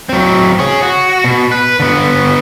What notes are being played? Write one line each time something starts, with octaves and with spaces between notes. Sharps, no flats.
F#3 C4
G#4 C#5
F#4
B2
B4
D3 B3